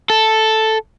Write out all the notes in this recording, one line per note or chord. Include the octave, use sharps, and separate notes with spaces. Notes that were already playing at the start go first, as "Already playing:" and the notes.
A4